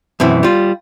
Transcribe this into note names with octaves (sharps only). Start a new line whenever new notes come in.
F#2 B2 E3 C4
G3 F4